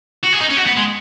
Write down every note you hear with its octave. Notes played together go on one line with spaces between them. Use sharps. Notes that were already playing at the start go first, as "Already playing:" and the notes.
F#4
G#4
D#4
C#4
F#4
B3
G#3